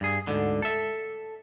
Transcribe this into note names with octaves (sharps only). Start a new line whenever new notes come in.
G2 G#4
D2 G#2 D3
A4 E5